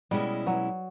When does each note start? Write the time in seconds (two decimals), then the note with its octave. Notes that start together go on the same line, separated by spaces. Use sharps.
0.11 B2 G3 G#3 C#4 E4
0.47 F#3